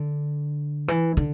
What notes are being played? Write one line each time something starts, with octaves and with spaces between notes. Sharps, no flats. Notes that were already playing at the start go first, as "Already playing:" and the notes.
Already playing: D3
E3
D3